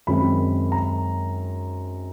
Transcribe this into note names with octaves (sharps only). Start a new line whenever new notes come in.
F#2 D#3 G#3 C4 B5
A#5